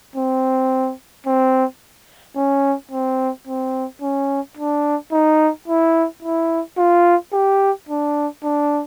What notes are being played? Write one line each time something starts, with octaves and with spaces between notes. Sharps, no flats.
C4
C4
C#4
C4
C4
C#4
D4
D#4
E4
E4
F4
G4
D4
D4